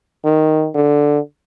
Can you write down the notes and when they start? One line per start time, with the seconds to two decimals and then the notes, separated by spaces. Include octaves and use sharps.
0.25 D#3
0.75 D3